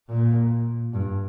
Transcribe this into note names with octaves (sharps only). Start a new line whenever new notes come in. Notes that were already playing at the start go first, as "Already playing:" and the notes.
A#2
G2